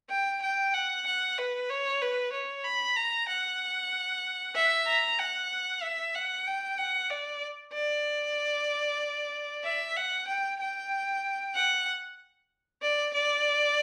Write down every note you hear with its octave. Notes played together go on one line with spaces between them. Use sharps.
G5
G5
F#5
F#5
B4
C#5
B4
C#5
B5
A#5
F#5
E5
A#5
F#5
E5
F#5
G5
F#5
D5
D5
E5
F#5
G5
G5
F#5
D5
D5